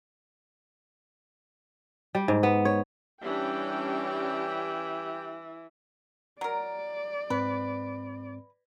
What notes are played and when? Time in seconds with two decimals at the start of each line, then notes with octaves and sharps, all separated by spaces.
2.15 G3
2.28 G#2
2.43 B3
2.65 C#5
3.23 E3 G3 C#4 D4 G4 G5
6.41 F#3 A#4 D5
7.30 G#2 C4 B4